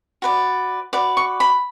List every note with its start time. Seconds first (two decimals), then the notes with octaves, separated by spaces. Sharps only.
0.22 F#4 B4 D5
0.93 F#4 B4 D5
1.17 C#6
1.40 B5